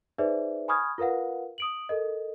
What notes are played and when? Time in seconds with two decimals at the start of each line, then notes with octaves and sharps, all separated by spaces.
0.18 D#4 G#4 B4 C5 D5 E5
0.68 G#5 B5 C#6 D#6 F6 G#6
0.98 F4 A#4 B4 F5 F#5
1.58 D#6 D7 F#7
1.89 A4 A#4 D#5